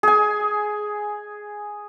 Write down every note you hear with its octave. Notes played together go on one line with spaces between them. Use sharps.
G#4 G#5